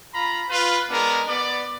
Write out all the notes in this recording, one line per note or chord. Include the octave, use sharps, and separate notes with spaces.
F4 A#5 B5
F4 B4
G#3 B3 D4 A#4
B3 D5